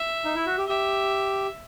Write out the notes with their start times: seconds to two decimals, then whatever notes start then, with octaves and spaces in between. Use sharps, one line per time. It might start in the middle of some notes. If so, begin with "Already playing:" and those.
Already playing: E5
0.25 D#4
0.35 E4
0.46 F#4
0.58 G4
0.68 G4 E5